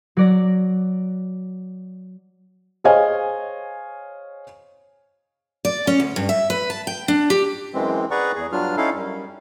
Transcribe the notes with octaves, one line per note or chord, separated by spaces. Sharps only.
F#3 D5 A#6
G#4 C5 C#5 D#5 F5 G#5
D5
C#4
D2
G2
E5
B4
A5
G5
D4
G4
F#2 E3 G#3 C4
G#4 B4 D5 F#5 A#5 C#6
E2 G#4
G2 F#3 G3 D4 F4 F6
C#4 D#4 E4 A4 F5
F#2 G3